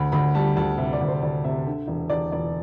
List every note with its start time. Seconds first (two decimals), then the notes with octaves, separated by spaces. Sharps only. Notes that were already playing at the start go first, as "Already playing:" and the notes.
Already playing: D2 B5
0.12 D2 B5
0.34 G3 A5
0.57 D2 A5
0.78 C3 E5
0.93 D5
1.01 D2
1.08 C5
1.22 D2 D5
1.44 C3 E5
1.66 D3
1.88 E1
2.10 E1 D5
2.32 E1 D5